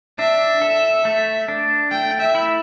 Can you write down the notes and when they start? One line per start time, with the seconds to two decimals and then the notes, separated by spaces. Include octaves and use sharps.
0.19 D4 E5
0.61 A4
1.05 A3
1.48 D4
1.91 A3 G5
2.20 E5
2.35 E4